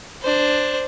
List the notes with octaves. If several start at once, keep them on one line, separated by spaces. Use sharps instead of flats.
D4 C5